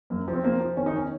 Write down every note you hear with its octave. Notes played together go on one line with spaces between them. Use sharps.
F#2 A#3
F3
C4
F3 A#3
F3
D#3 C#4
D#4
C#4